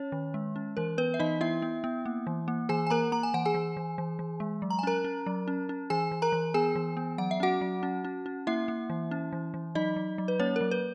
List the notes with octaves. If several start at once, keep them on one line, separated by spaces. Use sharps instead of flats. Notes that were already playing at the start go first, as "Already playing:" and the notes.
Already playing: C#4 C#5
D#3
G#3
C#4
E3 A#4
B3 B4
E5
E3 D#4 D#5
B3 E4 E5
B3
B3
A#3
E3
A#3
E3 G#4 G#5
G#5
A#3 A#4 A#5
A#3 A#5
G#5
E3 F#5
G#4 G#5
E3
E3
E3
E3
G#3
F#3
A#5
G#5
C#4 A#4 A#5
C#4
F#3
C#4
C#4
E3 G#4 G#5
E3
A#4 A#5
E3
B3 G#4 G#5
E3
B3
F#3 F#5
E5
C#4 F#4 F#5
F#3
C#4
C#4
C#4
A#3 E4 E5
A#3
E3
C#4
E3
E3
F#3 D#4 D#5
F#3
F#3
B4
A#3 C#4 C#5
F#3 A#4
B4